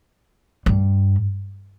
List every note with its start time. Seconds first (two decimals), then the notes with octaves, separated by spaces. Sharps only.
0.66 G2